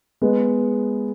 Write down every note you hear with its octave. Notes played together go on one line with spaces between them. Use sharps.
G#3 B3